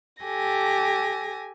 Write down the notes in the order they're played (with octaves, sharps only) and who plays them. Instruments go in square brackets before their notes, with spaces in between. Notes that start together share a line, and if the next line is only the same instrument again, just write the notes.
[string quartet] G4 A4 G#5 A#6